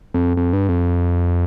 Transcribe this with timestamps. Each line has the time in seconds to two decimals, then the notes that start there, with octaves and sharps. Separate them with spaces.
0.14 F2
0.37 F2
0.53 G2
0.69 F2